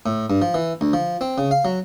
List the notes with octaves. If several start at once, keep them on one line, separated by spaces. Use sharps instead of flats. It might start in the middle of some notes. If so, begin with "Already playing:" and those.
A2
G2
F3
E3
D2
F3
C4
C#3
F5
F#3